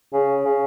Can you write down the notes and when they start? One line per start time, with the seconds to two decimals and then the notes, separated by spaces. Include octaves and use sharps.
0.13 C#3
0.45 C#3